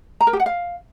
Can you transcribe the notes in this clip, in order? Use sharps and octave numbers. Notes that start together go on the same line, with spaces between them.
A#5
A#4
G4
F#5
F5